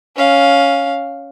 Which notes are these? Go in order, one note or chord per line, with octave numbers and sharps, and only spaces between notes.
C#4 F5